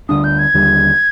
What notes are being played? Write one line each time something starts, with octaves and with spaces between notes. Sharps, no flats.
D2 D3 G3 D4 D#6
G6
G#6
D#2 D3 G3